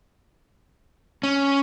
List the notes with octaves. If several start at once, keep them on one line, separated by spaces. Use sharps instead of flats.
C#4